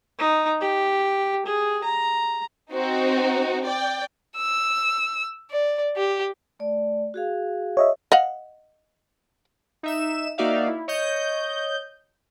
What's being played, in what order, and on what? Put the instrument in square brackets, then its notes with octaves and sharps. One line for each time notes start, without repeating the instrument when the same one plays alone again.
[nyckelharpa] D#4
G4
G#4
A#5
[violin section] C4 D#4 F#4
D5 G5
[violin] E6
D5
G4
[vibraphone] A3 D5
F#4 G#4 F5
[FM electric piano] C#5 D#5 E5
[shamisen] D#5 F5 F#5
[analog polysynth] D#4 E5 E7
A#3 D#4 F#4 D5 E5 F5
E4
C#5 D#5 G6